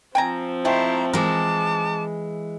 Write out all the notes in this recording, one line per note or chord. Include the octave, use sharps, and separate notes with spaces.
F3 C4 G5 G#5 A#5
G#3 A3 E4 G4 C5 A#5
E3 G#3 A#4 A5 D6